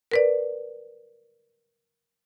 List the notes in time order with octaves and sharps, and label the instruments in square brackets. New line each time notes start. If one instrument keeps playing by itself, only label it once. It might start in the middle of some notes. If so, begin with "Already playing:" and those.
[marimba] A#4 B4 D5